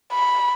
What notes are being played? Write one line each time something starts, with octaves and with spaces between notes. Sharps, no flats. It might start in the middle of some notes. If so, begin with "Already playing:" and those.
B5